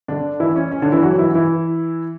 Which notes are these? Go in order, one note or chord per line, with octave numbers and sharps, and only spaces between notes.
D3 D4
E3 E4
C#4
C#4
D3 D4
E3 E4
F#3 F#4
F#4
E3 E4
E3 E4